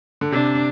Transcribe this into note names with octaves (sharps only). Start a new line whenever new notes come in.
D3
C3 D4